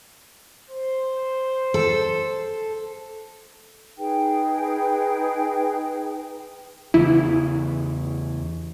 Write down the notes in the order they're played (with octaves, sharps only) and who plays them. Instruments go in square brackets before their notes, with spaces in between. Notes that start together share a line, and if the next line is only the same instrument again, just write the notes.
[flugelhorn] C5
[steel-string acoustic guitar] A4
[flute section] D#4 G#4 B4 G5
[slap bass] E2 C#3 E3 [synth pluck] E4